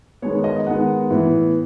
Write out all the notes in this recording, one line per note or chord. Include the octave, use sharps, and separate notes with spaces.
D#3 G#3 B3 C#5
D#5
D#3 G#3 B3 F#5
A2 E3 B3